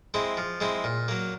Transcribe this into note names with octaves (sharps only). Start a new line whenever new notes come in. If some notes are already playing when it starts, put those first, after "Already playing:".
G#3 C4 E4
F3
G#3 C4 E4
A#2
F#3 A#3